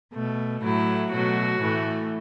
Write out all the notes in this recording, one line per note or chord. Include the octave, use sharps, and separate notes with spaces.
B2 A3
A2 F#3 A3 E4
B2 F#3 A3 F#4
A2 E3 A3